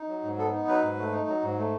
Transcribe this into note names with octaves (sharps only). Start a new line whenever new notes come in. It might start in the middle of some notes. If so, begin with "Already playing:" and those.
Already playing: D#4
F#3
G#2
B3 A4
D#4
F#3 B4
G#2
A3
D#4
F#3
G#2
A3